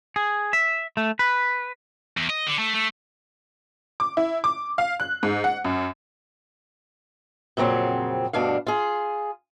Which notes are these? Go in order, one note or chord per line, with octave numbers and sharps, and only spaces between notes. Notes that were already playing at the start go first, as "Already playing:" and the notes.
G#4
E5
A3
B4
E2
D#5
D3
A3
A3
D6
E4
D6
F5
F#6
G#2
F#5
F#2
F2 A#2 C#3 F#3 C4
D2 G2 B2 D4 F5
F4 G#4